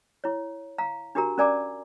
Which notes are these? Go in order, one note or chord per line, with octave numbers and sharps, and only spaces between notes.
E4 C#5
F5 A#5
D4 F#4 G4 A#4 A#5
C#4 A#4 D5 G#5 A#5 D6